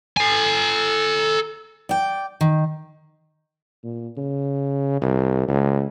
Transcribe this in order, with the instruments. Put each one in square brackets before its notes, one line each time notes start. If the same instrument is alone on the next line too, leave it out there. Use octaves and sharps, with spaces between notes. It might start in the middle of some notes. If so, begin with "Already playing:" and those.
[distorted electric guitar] A4 G#5
[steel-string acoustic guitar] D5 G5
D#3
[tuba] A#2
C#3
C2
C#2